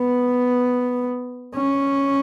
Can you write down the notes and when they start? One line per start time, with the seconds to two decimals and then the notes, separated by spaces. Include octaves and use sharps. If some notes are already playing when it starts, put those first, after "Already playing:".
Already playing: B3
1.55 C#4